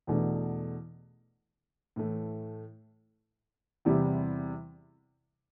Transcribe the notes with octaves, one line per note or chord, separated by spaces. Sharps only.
E2 B2 A3 D4
A2 E3 A3
E2 C3 G3 C4 E4